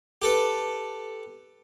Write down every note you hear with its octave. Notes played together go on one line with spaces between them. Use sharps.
G4 A4 B4